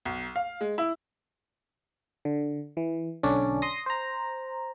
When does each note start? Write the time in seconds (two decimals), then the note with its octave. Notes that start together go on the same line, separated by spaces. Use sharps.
0.05 B1
0.36 F5
0.61 G#3
0.78 E4
2.25 D3
2.77 E3
3.23 B1 D3 C#4 D4 D5
3.62 C6 D#6 A#6
3.86 C5 A#5